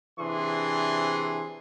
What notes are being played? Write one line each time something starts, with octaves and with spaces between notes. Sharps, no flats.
C3 E3 D4 G#4 C6